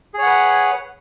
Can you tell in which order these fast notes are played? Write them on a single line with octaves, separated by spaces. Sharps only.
G#4 C#5 F#5 B4